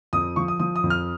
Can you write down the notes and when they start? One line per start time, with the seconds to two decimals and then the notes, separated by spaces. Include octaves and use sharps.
0.13 F2 D#6
0.36 F3 C#6
0.48 D#6
0.60 F3 D#6
0.76 D#6
0.84 F2
0.90 F6